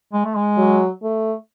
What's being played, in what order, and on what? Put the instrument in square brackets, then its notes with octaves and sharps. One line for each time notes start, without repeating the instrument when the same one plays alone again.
[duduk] G#3
A3
G#3
[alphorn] F#3
A3